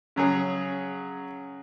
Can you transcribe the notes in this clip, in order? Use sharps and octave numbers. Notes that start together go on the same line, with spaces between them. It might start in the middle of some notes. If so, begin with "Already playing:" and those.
C#3 F#3 C#4 G#4